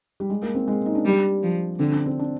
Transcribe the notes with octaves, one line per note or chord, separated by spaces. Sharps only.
G3
G#3
A#3
C4
G#3
D#4
D4
G3
F3
D3 C4
D4
C4
D4